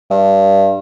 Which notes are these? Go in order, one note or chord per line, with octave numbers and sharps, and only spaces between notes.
G2